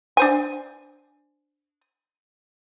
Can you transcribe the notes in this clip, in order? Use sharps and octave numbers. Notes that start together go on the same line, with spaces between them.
D4 C5 G#5